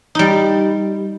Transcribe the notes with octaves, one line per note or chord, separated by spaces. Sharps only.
G3 D#4